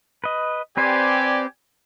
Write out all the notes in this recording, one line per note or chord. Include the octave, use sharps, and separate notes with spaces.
B4 D#5
C4 G4 B4 C5 D5 G#5